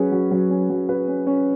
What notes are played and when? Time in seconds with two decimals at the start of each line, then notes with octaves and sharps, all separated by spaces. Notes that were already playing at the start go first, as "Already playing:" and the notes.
Already playing: F#3 C#4 G#4 B4
0.12 F#3
0.31 F#3
0.50 C#4
0.70 F#3
0.89 B4
1.08 C#4
1.27 C#4